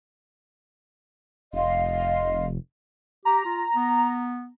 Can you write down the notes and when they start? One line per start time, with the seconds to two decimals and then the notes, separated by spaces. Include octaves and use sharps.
1.53 F1 D#5 F5 C6
3.25 G4 A#5
3.45 F4
3.75 B3